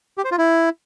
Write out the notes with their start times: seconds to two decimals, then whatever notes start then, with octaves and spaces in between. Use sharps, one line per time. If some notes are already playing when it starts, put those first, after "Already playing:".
0.18 G4
0.24 C5
0.31 F4
0.38 E4